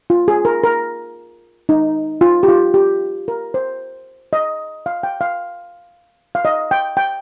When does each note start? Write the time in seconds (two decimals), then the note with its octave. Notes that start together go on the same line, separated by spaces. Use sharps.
0.10 F4
0.28 G#4
0.45 A#4
0.63 A#4
1.69 D#4
2.21 F4
2.43 G4
2.48 F4
2.74 G4
3.28 A#4
3.54 C5
4.33 D#5
4.86 F5
5.03 G5
5.21 F5
6.35 F5
6.45 D#5
6.71 G5
6.97 G5